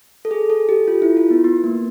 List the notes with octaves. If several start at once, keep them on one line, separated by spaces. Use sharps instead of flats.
A4
G#4
A4
G4
F4
E4
F4
B3
B3
A#3